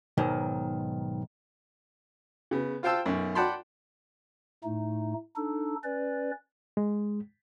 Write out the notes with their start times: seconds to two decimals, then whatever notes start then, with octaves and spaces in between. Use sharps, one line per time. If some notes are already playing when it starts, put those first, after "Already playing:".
0.18 B1 G#2 D#3
2.51 C#3 B3
2.83 F4 C5 F5 G5 A5 E6
3.06 B1 F#2
3.35 D5 F#5 G5 A5 B5 C6
4.64 A2 A3 D#4
5.36 D4 D#4 A4
5.84 C#4 B4 D5
6.77 G#3